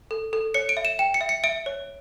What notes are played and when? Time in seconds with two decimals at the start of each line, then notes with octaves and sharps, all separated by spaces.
0.11 A4
0.33 A4
0.54 C#5 C#7
0.69 D7
0.77 E5
0.85 E7
0.99 G5 E7
1.14 C#7
1.21 E5
1.29 C#7
1.44 E5 D7
1.66 C#5